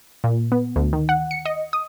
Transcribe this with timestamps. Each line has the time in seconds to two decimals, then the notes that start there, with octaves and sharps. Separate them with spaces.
0.24 A#2
0.52 B3
0.76 D2
0.93 D#3
1.09 F#5
1.31 C#7
1.45 D#5
1.73 D#6